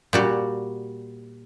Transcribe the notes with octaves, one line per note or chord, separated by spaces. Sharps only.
A#2 G3 F#4